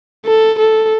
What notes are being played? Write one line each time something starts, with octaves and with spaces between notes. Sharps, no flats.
A4
A4